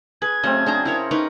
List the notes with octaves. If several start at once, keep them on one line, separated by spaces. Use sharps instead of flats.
G#4 B4 G#6
C#3 F#3 A3 C4 D#5
D4 G#4 C5 A#5
E4 A#4 C#5
D#4 A#4 B4 C#6